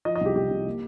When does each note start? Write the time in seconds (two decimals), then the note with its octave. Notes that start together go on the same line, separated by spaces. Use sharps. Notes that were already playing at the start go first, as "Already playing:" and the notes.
0.05 F3 D#5
0.16 D#5
0.21 C2 G4
0.35 C2 G4
0.51 C3
0.66 A#3